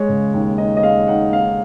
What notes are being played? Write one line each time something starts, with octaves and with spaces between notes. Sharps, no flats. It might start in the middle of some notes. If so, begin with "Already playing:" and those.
Already playing: G#3 C#5
C#3
D#2
D#4 D#5
D#5
G#3 F5
D#4 F#5
D#4 F5